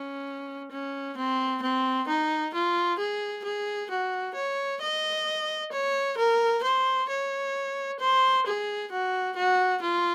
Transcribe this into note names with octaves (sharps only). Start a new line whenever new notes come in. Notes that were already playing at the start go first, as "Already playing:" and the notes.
Already playing: C#4
C#4
C4
C4
D#4
F4
G#4
G#4
F#4
C#5
D#5
C#5
A#4
C5
C#5
C5
G#4
F#4
F#4
F4